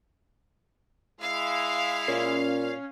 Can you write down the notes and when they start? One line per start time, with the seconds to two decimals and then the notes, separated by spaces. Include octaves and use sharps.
1.21 G#3 E4 F5
2.08 A#2 C#4